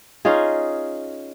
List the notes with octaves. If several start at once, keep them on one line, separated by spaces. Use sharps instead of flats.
C#4 D#4 F4 G#4